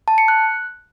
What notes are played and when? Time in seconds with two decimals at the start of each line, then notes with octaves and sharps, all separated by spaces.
0.08 A5
0.18 C#7
0.28 F#6